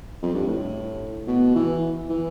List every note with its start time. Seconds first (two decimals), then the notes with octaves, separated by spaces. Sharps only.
0.23 F2
0.34 G2
0.47 A2
1.28 B2
1.55 E3
2.09 E3